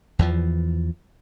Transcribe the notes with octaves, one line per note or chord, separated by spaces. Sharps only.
E2 E3 F3